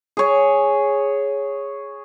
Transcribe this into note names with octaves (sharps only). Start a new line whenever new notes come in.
G#4 C#5